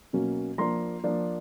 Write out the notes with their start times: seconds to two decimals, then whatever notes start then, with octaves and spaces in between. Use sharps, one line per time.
0.13 B2 F#3 A#3 C#4
0.58 F3 A#3 D4 A#5 C6
1.04 F3 A#3 D4